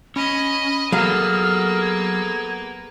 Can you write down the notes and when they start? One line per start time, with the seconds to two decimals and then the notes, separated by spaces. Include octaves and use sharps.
0.16 C#4 D#5 B5
0.92 F#3 A#3 B3 G#4 A4 F5 F6
1.81 G#6